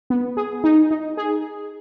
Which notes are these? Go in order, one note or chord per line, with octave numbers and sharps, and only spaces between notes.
B3
G#4
D#4
D#4
G#4